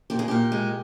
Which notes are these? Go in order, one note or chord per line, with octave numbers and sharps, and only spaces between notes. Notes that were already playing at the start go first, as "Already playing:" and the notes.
A#2 G4
G#4
A#2 G4
G#3